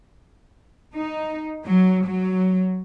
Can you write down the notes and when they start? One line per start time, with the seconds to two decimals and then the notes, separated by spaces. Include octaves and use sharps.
0.95 D#4
1.66 F#3
2.05 F#3